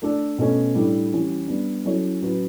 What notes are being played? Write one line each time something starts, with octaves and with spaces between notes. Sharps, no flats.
A3 D4 A4
B2 A3 C#4
A2 G3 D4 A4
E3 G3 C#4 E4 G4
G3 B3 D4
F#3 C#4 E4 A4 C#5
A2 F#3 C#4 F#4 B4